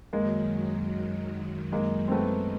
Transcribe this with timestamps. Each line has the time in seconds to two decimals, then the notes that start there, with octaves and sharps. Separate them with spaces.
0.13 F#2 D#3 F#3 G#3 A#3
1.72 G#3 A#3
2.08 C4
2.11 A3 B3